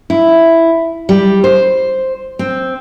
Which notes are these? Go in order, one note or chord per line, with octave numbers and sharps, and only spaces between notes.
E4
G3
C5
C4